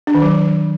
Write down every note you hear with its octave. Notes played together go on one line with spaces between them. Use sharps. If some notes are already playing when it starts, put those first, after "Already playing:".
D4
D#3
F#3